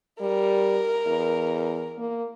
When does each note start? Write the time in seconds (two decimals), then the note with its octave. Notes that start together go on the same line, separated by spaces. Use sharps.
0.21 G3 A#4
1.06 E2
1.98 A#3